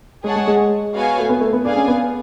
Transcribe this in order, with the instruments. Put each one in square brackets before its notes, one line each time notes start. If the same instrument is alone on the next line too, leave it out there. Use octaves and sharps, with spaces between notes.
[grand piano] G#3 [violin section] G#4 C#5 F#5 A5
[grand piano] G#3
G#3
[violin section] B3 F#4 C#5 F5 G#5
[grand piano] A3
B3
A3
B3
[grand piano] D4 [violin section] G#4 D5 F5 G#5
[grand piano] C#4
B3